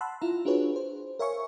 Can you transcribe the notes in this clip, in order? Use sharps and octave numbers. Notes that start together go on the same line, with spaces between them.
F#5 A5 B5 C6 E6 F#6
E4 F4 F5 A#5
D4 F4 F#4 G#4 B4 C#5
C5
A#4 C#5 E5 F5 G#5 C#6